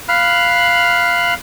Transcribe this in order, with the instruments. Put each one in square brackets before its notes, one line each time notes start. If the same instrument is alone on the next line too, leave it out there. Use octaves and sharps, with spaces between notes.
[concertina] F5 B5 F6 F#6